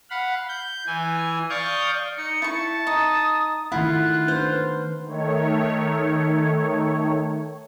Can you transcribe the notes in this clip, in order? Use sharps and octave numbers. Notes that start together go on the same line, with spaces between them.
F5 F#5 B5
G6
E3 G#5
D5 F5 C#6 D#6 G6
D#4 C#7
E4 A5 C#6
D#4 D#6
D#3 A3 E4 F4 F#5 F#6
D4 B4 C5
D#3 A3 C#5